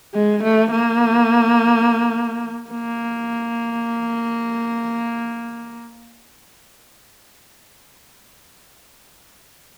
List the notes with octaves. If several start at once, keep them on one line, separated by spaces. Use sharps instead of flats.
G#3
A3
A#3
A#3